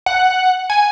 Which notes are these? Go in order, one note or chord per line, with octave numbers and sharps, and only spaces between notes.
F#5
G#5